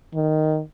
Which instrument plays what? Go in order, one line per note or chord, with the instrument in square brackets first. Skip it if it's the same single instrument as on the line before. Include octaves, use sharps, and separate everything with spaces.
[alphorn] D#3